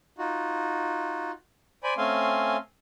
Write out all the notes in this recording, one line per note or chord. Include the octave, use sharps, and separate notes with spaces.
D#4 F4 F#4
C5 D5 G#5 B5
A3 C4 C#4 F5 G#5 C6